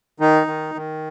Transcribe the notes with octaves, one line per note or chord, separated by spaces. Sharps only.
D#3 D#4
D#3
D#3